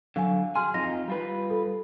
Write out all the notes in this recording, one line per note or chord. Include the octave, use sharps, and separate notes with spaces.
D3 F#3 F5 G#5
F#4 G#4 G#5 C6 F6
F2 D#4 F4 A#6
G3 F4 B4
A4